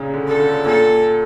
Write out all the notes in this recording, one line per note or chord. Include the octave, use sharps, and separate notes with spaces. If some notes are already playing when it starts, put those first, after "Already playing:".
Already playing: A#2 C#3
D3
A4
D3
A#2 A4